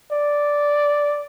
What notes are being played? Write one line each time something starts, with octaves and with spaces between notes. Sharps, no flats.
D5